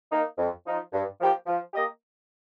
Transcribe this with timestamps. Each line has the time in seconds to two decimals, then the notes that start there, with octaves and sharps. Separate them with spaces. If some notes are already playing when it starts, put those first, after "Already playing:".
0.12 A#3 D#4
0.38 F2
0.66 F3 D#4
0.93 G2
1.19 F3 A#3 G4
1.47 F3
1.74 A#3 G4 D#5